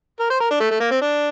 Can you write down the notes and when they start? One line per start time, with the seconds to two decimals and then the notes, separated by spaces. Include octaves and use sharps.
0.20 A#4
0.30 C5
0.40 A#4
0.51 D4
0.60 A3
0.71 A3
0.80 A#3
0.91 C4
1.01 D4